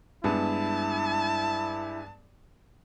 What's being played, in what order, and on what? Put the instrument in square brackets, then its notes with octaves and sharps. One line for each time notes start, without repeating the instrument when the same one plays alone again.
[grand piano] G2 [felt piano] G#3 B3 [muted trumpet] E4 [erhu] A5